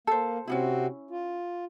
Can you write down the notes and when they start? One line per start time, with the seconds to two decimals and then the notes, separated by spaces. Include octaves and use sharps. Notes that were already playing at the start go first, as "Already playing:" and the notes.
0.07 A#3 A4 C5
0.48 C3 C4 C#4 D#4 E4 F#4
1.11 F4